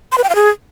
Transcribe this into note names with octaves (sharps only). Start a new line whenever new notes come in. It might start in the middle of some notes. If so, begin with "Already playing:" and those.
C6
B4
G5
F5
G#4